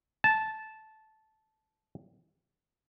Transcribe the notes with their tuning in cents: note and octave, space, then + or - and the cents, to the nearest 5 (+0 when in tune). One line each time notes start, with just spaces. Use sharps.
A5 -10